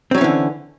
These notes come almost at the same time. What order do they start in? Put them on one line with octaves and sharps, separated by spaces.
C4 F#3 C#4 E3 D3